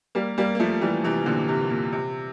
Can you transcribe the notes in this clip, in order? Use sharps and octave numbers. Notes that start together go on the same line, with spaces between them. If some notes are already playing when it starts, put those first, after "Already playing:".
G3 A#3
G3 A#3
A#3
F3 A3
E3 G3
C3 E3
A#2 D3
C3
A#2
C3